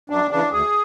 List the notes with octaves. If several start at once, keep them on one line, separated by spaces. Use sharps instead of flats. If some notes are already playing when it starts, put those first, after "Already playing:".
F#2 D4
C#3 E3 D4
D2 G#4